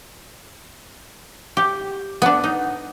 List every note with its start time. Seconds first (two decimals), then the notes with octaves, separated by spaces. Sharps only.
1.57 G4
2.22 B3 D4
2.44 D#4